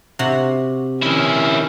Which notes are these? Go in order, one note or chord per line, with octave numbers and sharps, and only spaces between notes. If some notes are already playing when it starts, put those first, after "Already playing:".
C3 F#4
D#3 C#4 E4